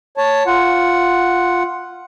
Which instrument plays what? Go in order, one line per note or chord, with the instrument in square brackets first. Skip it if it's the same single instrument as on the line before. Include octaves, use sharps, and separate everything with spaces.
[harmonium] C#5 A5
F4 F#5